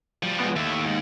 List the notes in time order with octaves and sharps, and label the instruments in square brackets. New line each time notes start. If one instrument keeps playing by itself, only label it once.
[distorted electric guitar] F3 G3
[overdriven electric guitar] G#3 B3
[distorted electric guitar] D#2 [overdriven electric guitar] A2 E5
[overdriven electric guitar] G#2